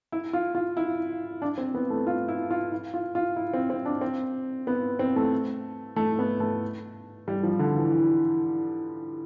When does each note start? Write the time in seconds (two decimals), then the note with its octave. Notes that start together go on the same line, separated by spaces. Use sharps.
0.12 E4
0.33 F4
0.55 F4
0.77 E4
1.42 D4
1.58 C4
1.75 B3
1.90 A3
2.07 F4
2.28 E4
2.51 F4
2.72 E4
2.94 F4
3.15 F4
3.36 E4
3.54 C4
3.70 C4
3.85 D4
4.01 C4
4.67 B3
4.99 C4
5.16 A3
5.96 A3
6.19 B3
6.40 A3
7.28 G3
7.43 F3
7.59 D3
7.76 E3